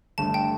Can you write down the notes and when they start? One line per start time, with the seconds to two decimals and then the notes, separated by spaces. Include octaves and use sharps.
0.18 G1 G2 D3 A3 A5
0.34 G5